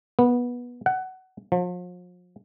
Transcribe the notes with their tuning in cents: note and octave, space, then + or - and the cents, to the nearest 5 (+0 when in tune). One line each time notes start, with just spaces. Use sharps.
B3 -15
F#5 +20
F3 +40